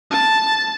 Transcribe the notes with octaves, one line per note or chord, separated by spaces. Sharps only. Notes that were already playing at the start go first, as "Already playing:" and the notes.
A5